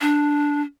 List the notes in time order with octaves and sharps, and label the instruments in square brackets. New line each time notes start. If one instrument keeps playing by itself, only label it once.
[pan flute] D4